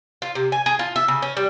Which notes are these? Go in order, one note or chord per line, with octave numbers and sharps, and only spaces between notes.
F4
C3
G#5
G#4
F4
E5
C#3
C#4
G3